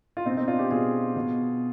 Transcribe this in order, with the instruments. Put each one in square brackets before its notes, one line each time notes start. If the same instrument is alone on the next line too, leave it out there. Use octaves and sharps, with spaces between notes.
[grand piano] F4
B2 C4 D#4
C4 D#4
D4 F4
D#4 G4
B2 F4 G#4
B2